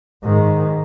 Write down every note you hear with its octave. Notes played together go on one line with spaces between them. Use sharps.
G#2 D#3